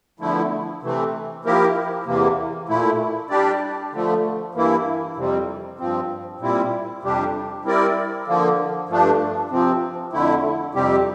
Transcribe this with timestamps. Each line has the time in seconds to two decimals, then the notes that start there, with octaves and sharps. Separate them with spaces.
0.20 E2 D3 F3 A3 E4
0.83 C3 E3 A3 C4
1.45 F3 A#3 E4 G4 A#4
2.06 E2 C3 E3 A#3
2.69 A#2 A3 E4
3.30 G3 D4 G4 D5
3.92 D3 F3 A3
4.55 G2 E3 A#3 E4
5.16 F2 C3 G3 C4
5.79 G2 F3 C4
6.40 A#2 G3 C4 E4
7.03 F2 C3 G3 D4 G4
7.65 G3 C4 E4 A#4 D5
8.27 D3 F3 A#3
8.89 G2 F3 A3 D4
9.50 C3 F3 C4
10.13 F2 D3 A3 E4
10.74 F2 C3 G3 C4 G4